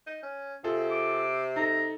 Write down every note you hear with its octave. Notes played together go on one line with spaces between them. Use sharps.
D#4
C#4
C3 F4 G#4 A4
D6
D#4 A4 A#5